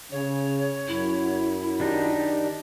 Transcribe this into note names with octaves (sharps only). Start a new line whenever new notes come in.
C#3 C#5
F#2 E4
D#3 D4 D#4 G4